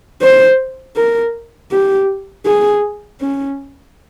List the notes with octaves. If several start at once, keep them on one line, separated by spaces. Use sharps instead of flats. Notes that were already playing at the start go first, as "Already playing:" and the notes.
C5
A#4
G4
G#4
C#4